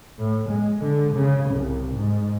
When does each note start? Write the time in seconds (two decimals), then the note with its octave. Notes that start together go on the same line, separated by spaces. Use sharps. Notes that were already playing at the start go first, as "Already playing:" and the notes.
0.19 A2
0.50 G#3
0.84 D3
1.16 C#3
1.51 C2
1.95 G#2